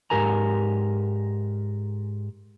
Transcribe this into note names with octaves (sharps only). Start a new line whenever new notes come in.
G#2 D#3 G4 A#4 G#5 A#5